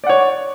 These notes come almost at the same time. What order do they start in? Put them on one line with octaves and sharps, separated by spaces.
D5 F#5 C#5